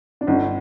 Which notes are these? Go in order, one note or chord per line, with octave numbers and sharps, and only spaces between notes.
D4
G1 C#4 D#4